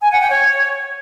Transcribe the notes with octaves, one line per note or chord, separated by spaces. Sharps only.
G#5
F#5
G5
C#5